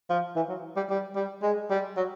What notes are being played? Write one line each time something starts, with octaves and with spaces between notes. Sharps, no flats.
F3
E3
F#3
G3
G3
G3
G#3
G3
F#3